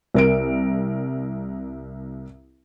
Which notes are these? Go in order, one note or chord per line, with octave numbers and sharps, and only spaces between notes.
C2 A#4 D7